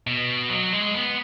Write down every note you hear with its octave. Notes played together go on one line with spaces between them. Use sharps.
B2
F#3
G#3
B3